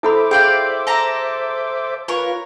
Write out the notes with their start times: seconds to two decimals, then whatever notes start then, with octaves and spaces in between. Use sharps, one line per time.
0.03 E4 A4 C5 E5 B5 D6
0.31 G#4 D5 F5 G5
0.87 A4 A#5
2.08 F4 A#4 B4 C#5